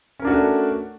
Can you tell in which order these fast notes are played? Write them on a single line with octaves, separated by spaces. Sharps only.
C#4 A#4 D4 F#4 A3